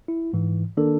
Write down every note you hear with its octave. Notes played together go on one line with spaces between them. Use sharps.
E4
G#2 E3
D#3 A#3 D4 A4 A#4